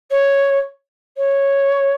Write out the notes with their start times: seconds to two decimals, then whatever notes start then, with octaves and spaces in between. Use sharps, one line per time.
0.11 C#5
1.17 C#5